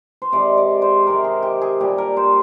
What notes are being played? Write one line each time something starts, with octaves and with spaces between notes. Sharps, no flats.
C5
C3 D#3 G#3 D5
D5
C5
C3 D#3 G#3 A#4
G#4
G4
G#4
A#2 G3 D4 G4
A#4
C5